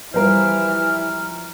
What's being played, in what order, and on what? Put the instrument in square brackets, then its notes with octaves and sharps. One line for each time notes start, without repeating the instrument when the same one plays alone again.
[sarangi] E3 [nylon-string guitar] F3 G3 F4 [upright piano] A#4 C5 [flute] F6